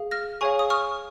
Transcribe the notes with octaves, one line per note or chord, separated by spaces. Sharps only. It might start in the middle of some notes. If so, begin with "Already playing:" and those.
Already playing: G#4 F5
F6 A#6
G#4 C#5 F5 G#5 C#6
D#6
C#6 F6